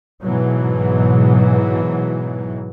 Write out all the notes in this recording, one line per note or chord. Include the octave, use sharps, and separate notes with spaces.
G#2 B2 E3 F#3